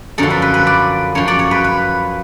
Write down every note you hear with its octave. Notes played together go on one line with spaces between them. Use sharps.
F#2 D3 F3 A4
B4
B4
B4
D5
F#2 F3 C#5
D5
C#5
B4
B4